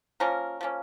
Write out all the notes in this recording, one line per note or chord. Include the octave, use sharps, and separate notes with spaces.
F3 A#3 C#4 A#4
F3 A#3 C#4